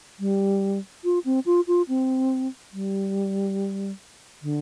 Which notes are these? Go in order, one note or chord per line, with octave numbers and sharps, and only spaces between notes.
G3
F4
C4
F4
F4
C4
G3
D3